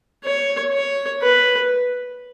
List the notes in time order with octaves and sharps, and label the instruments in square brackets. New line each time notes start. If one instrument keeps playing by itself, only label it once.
[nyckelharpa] C#5
C#5
B4